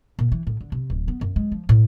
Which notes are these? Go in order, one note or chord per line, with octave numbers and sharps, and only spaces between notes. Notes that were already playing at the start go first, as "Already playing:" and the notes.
A#2
E3
A2
D3
C3
D1
B3
F#2
G#3
F3
A2